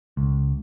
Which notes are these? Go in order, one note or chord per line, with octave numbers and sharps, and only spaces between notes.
C#2